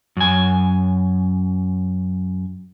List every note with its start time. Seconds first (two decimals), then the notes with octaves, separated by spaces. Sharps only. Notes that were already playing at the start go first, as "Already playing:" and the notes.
0.17 F#2 G#5